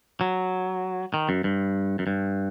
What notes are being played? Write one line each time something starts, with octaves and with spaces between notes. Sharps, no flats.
F#3
D#3
F#2
G2
F#2
G2